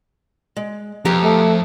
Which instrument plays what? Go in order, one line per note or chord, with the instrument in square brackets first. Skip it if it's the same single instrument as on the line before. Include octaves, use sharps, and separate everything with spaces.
[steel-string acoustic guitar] G#3
[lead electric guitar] F2 [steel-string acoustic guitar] B2 G4 A#5
[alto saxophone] A3